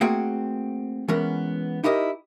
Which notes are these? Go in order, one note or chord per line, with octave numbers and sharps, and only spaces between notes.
A3 A#3 C4 F#4 G#4 G5
E3 G#3 B3 C#4 A#4
D#4 E4 G4 A#4 D#5